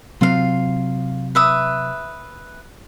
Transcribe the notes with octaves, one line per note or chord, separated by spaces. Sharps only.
C3 F#3 C4 F4 F5
B4 E5 D#6